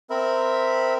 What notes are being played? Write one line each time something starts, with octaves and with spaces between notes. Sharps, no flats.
C4 A#4 E5 B5